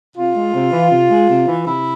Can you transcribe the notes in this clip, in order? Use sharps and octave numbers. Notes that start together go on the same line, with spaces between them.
C3 F4
G#3
C3
E3
C3
G#3
C3
E3
C3 E4